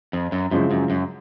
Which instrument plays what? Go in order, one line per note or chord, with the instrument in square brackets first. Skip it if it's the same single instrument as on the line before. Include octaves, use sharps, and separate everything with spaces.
[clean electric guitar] F2
F#2
[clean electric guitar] F#2 [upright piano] C#3 F3 G#3 C4 E4
[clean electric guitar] F#2
F#2